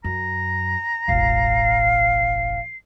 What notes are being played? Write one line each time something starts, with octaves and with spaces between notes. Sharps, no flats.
F#2 A#5
E1 A1 F5 C7